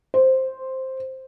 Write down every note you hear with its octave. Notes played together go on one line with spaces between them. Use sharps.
C5